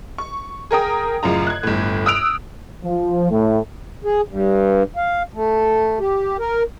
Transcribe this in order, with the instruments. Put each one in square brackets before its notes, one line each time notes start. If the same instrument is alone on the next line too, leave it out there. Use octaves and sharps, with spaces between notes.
[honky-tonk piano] C#6
G#4 A#4 G5 D#6
A1 F#2 C#3 F4 A#5
F#6 G#6
G1 A2
D#6 E6 F#6 D7 F7
[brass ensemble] F3
A2
[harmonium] G#4
G2
F5
A3
G4
A#4